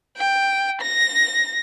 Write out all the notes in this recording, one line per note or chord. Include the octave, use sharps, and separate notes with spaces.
G5
A#6